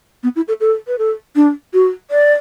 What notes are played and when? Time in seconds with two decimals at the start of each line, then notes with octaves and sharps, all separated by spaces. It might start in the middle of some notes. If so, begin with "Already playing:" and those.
0.23 B3
0.36 E4
0.48 A4
0.60 A4
0.88 B4
0.99 A4
1.36 D4
1.74 F#4
2.11 D5